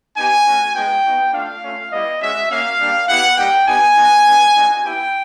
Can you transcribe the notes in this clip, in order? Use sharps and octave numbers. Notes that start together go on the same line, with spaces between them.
B3 D#4 G4 G#5
A3 C#4 F#4
G#3 B3 D#4 F#4 G5
B3 D#4 F#4
A3 D4 F4 F5
A3 C#4 F4
G3 B3 E4 G4 D#5
G#3 C#4 F#4 E5
A#3 C#4 F#4 F5
G3 A#3 D4 G4
B3 E4 G4 F#5
G3 A#3 D#4 G4 G5
B3 D#4 G4 G#5
B3 D#4 F#4
G#3 B3 D4
G3 C4 D#4 F#4
B3 E4 G4 G5